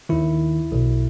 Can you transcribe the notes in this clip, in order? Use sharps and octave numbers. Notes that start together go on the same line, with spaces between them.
D#2 D#3 E4
B1 B2